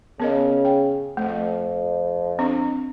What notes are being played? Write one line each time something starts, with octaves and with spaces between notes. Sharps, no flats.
C#3 B3 A#4 D#5
G5
F2 A3
C4 D4